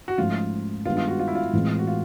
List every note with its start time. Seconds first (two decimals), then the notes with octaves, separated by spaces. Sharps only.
0.08 F#4
0.18 G#2 F3 A3 C#4 F4
0.85 G2 D#3 G#3 B3 F4
0.97 F4
1.08 F#4
1.19 F4
1.28 E4
1.35 F4
1.53 A2 E3 G#3 C4
1.79 F#4
1.87 F4